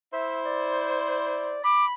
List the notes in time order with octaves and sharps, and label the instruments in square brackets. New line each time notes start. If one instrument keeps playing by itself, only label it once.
[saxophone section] E4 C5 [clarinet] E5
[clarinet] D5
[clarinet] B5 [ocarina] D6